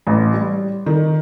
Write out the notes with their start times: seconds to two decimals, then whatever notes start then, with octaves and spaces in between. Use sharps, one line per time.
0.07 A1
0.34 G3
0.86 D#3